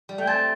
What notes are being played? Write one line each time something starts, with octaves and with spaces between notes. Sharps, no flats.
G3
A3 G5
C4 A5